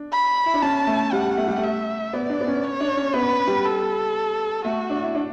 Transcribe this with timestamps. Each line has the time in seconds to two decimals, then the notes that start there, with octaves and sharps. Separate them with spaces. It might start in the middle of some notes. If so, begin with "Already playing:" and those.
Already playing: D4
0.12 B5
0.46 E4
0.54 D4
0.62 C#4 A5
0.87 A3
1.12 G3 F#5
1.37 A3
1.48 G3
1.57 A3
1.63 E5
2.13 B3 D5
2.30 D4
2.41 B3
2.47 C#4
2.64 C#5
2.80 D4
2.97 C#4
3.14 B3 B4
3.47 G3
3.65 A4
4.65 A3 F#4
4.90 D4
5.03 E4
5.15 D4